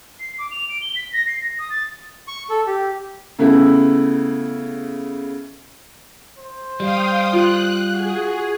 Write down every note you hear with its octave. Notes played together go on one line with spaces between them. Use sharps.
C7
D6
F7
D7
G7
B6
A#6
C7
A#6
D#6
A6
C#6
A4
G4
C#3 A3 B3 E4
C5
G3 F5 G5 D#6
F4 F#6
F#4 G#4